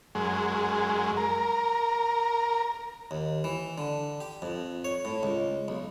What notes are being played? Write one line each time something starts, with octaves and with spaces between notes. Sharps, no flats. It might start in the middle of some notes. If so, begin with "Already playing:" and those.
F#2 G#3
A#4
D#2
E3
D3
G4
F2
C#5
A2
C#2
B1